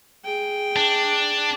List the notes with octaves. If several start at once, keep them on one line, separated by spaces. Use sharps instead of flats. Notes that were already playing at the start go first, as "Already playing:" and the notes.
G#4 G5
D4